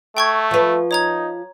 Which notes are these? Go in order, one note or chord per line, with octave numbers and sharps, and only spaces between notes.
A3 G5 C#6 G#6
F3 B4
D#4 C#5 A#5 G#6